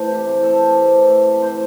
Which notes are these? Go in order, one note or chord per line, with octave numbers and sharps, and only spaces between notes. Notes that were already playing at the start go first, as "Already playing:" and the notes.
Already playing: E3 A3 C5
C3
E3
A3 A4
C3
C3
E3
A3
C3
A2 C5